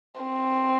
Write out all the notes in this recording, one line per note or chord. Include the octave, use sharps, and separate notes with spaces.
C4